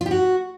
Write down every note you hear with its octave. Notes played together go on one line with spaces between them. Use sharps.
F4
G4
F#4